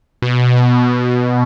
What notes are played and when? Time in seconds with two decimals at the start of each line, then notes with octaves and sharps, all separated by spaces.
0.22 B2